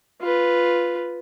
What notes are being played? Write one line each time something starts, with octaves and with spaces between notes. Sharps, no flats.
F4 B4